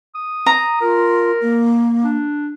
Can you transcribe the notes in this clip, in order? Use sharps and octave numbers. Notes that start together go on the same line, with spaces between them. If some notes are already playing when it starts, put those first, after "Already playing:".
D#6
A#5
F4 A#4
A#3
D4